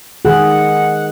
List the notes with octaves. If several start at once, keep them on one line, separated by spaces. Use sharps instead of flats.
D#3 G#4 F#5